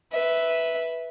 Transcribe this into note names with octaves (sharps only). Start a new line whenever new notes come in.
B4 E5